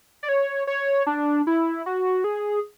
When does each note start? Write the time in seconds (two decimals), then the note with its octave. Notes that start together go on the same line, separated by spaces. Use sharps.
0.23 D5
0.29 C#5
0.67 C#5
1.07 D4
1.47 E4
1.86 F#4
2.24 G#4